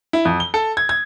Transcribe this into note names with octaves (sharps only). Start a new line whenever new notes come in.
E4
F2
G7
A4
G#6
G#6